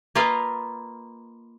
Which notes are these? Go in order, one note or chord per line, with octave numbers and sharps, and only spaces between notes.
A#3 F4 A#4 B4 D#5 F5